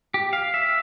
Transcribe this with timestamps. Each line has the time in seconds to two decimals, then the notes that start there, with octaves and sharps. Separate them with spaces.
0.14 G4
0.33 F5
0.54 E5